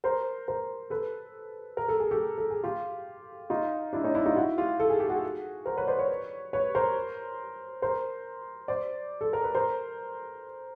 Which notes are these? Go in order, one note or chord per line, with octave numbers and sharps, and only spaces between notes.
A#4 C5
A#4 C5
A4 B4
A#4
A4
G#4
G4 A4
A4
G#4
F4 G4
D#4 F4
D4 E4
C#4 D#4
D4 E4
D#4 F4
E4 F#4
F4 G4
A4
G#4
G4
F#4 G#4
A#4 C5
B4 C#5
C5 D5
B4 C#5
B4 C#5
A#4 C5
A#4 C5
C5 D5
A4
A#4
B4
A#4 C5